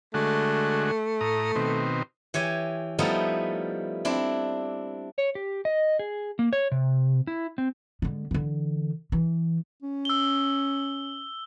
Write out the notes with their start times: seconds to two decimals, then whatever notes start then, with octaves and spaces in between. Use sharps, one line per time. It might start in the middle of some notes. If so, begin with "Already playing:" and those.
0.14 D3 G#3 A3 F#4
1.21 A2 A#5 D#6
1.56 B2 D#3 C4
2.34 E3 G4 C#5 G#5
2.99 F3 G3 A3 B3 D#4 E4
4.05 C4 D4 E4
5.18 C#5
5.35 G4
5.65 D#5
5.99 G#4
6.39 A#3
6.53 C#5
6.72 C3
7.27 E4
7.58 C4
8.02 D3 G#3
8.31 D3 E3
9.12 E3
9.83 C#4
10.05 E6 G7